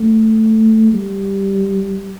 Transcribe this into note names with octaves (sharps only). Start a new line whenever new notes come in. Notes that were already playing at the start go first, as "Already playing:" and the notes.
Already playing: A3
G3